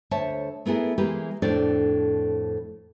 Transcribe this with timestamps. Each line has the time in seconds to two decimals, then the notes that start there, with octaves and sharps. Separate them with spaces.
0.11 D2 C5 C#5 E5 A5
0.66 A3 B3 E4 G#4 A#4
0.98 E3 G#3 A#3 G4 B4
1.42 F2 A2 D4 A4 C5 D5